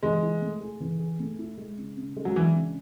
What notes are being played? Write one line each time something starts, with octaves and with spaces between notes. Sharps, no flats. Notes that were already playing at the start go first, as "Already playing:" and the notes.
E3 G#3
E4
A3
G#4
E3
G#4
A3
E4
G#3
C#3
C#3
G#3
F#3
E3 D4
C#3